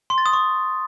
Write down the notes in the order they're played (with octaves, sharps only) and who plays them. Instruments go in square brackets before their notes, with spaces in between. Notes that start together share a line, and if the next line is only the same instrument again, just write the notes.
[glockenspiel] C6
A6
D#6
C#6